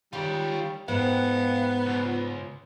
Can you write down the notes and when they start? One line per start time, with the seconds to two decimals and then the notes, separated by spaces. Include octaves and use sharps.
0.13 D#3 G3 F4 G4 C#5
0.88 G#2 B3 F5 G5
1.86 C#2 F4